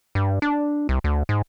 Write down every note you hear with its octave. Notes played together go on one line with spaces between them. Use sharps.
G2
D4
C2
D2
G#2